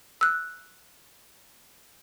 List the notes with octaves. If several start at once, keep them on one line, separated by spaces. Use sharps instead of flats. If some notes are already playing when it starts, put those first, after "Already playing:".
E6 F#6